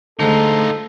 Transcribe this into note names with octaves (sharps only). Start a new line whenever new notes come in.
D3 G#3 A3 D#4 F4 A4 C5 A#5